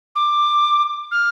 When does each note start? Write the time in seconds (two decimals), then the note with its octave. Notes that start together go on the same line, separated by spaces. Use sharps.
0.15 D6
1.11 F6